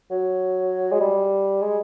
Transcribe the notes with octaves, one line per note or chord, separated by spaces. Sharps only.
F#3
G#3
G3
G#3